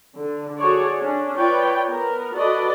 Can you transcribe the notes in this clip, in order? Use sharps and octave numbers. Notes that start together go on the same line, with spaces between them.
D3
F#4 G#4 A4 C#5 D5
C#4 D4
F4 B4 C#5 D5 G5
B3 A#4
F#4 A4 B4 D5 D#5